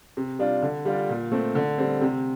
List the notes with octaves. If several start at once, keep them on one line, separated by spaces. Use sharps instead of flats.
C3
G3 D4 F4
D3
G3 D4 F4
A#2
A3 C4
D3
G3 C4
C3